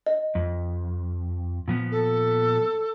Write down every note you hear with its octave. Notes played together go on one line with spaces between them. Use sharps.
D#5
F2
A#2 F3 B3
A4